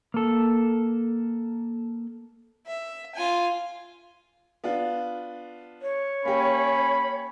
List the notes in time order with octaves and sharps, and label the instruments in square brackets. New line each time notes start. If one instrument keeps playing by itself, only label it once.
[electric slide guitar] A#3 A4
[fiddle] E5
F4 G#5
[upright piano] B3 D4 F4
[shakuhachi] C#5
[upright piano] A#3 G4 [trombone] C#4 [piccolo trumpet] B5